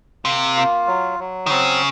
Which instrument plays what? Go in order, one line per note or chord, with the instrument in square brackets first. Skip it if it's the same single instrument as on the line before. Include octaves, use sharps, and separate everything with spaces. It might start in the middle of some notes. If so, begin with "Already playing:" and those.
[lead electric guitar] C3 [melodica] A#3
[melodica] F4
F#3
F#3
[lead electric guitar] D#3
[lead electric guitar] C#3 [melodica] C4